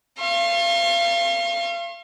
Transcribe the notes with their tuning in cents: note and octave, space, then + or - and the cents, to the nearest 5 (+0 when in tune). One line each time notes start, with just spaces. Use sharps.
F5 -30 C6 +45